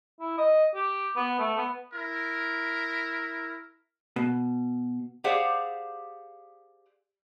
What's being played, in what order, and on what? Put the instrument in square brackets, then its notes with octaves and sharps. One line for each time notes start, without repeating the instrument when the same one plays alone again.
[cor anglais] E4
D#5
G4
B3
A3
B3
[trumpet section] E4 A#4
[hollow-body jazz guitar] B2
[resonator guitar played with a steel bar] G4 G#4 C5 D5 F5 F#5